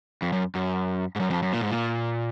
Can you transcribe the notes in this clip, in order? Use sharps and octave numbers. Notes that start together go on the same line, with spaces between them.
F2
F#2
F#2
G#2
F#2
F2
F#2
A#2
G#2
A#2